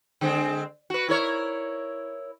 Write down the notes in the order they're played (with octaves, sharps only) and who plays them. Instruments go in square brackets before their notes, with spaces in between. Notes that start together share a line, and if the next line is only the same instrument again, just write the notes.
[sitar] D3 G#3 C4
F#4 B4
E4 A#4 C#5